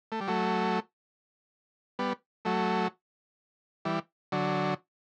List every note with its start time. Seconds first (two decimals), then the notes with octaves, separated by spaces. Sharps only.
0.12 A3
0.21 G3
0.28 F#3 A3
1.99 G3 B3
2.45 F#3 A3
3.85 E3 G3
4.32 D3 F#3